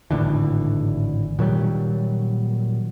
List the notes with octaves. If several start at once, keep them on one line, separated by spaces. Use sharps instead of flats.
G#1 A2 D3 E3
A#2 D#3 F#3 G3